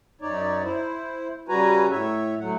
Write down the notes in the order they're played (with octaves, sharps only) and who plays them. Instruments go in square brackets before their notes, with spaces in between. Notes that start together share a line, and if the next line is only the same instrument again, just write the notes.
[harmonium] F#2 D#4 C#5 D5
E4 C5
C#3 G3 F#4 B4 G#5 A#5
A2 C#5 E5
D2 F#3 A3 F#5